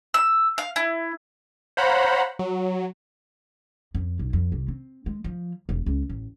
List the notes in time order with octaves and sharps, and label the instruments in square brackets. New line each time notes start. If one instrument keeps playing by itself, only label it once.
[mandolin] E6
F5
E4
[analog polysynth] C5 C#5 F5 F#5 A#5 B5
F#3
[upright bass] F2
B1
F2
C2
C4
G#3
F3
E1
C#2
A1